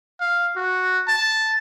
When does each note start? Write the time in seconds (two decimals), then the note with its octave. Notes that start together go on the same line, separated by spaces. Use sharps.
0.21 F5
0.56 F#4
1.08 A5